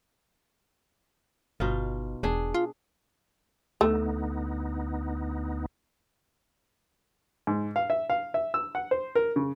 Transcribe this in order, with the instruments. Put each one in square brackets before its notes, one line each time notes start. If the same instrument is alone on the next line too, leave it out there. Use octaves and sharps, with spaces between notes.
[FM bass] G1 [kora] B2 D#4 F4
[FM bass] E1 [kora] D4 G#4
[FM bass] F4
[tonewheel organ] D2 B3 D#4 [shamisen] A3
[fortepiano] G#2
F5
E5
F5
E5
E6
F#5
C5
A#4
C#3